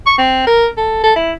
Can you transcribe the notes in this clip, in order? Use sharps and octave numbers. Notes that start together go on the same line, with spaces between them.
C#6
C4
A#4
A4
A4
E4